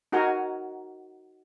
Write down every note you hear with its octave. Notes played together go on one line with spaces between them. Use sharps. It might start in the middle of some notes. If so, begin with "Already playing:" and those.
D#4 F#4 A#4 F#5 G#5 A#5